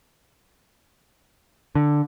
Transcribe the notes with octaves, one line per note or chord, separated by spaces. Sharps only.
D3